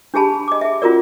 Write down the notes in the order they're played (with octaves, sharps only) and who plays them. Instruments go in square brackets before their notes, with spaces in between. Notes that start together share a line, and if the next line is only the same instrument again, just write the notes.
[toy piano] D4 G4 G#4 A5 B5
D#5 D6
G#4 E5
C#4 F4 F#4 A#4 D5